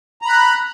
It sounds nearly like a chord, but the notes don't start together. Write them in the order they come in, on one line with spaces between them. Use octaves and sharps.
A#5 B5 F#6